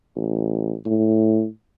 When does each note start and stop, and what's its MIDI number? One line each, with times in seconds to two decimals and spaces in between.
0.15 0.74 33
0.85 1.46 45